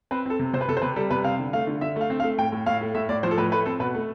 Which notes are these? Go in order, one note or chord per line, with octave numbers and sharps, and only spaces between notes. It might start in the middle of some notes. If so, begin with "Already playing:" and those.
C4 B4
C4 A4
C3
C3 C5
B4
C3 A4
C5
C3 B4
G3 A4
C3 B4
C4 F5
D3
A3 F5
D3
D3 E5
A3 F5
C4
F5
A3
A2 G5
A2
A2 F5
A3
A2 E5
A2 D5
F3 C5
A4
A2 B4
A3 B4
C4 A4
B2 B4
A3